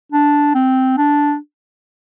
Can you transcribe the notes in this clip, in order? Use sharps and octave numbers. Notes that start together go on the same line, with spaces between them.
D4
C4
D4